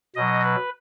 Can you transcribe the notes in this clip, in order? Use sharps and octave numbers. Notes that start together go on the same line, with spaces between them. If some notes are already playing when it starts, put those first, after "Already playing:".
B2 F#3 D#5
B4